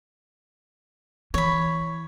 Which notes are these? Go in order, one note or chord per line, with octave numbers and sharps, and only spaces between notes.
E3 C#5 B5